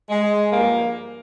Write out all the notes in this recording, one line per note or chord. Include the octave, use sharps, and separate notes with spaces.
G#3
G2 F3 A#3